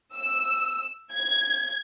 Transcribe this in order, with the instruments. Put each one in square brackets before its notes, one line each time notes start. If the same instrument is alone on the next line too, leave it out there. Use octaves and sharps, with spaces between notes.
[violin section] E6
G#6